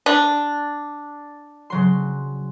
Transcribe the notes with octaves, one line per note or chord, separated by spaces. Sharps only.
D4
C#3 F#3 C6